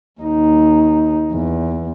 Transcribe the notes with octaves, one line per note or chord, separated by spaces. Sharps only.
D#2 D#4
E2